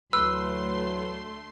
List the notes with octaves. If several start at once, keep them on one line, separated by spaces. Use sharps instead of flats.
D2 A2 E3 F#3 A3 B4 C6 E6